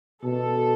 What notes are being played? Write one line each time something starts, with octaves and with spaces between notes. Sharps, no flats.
B2 A4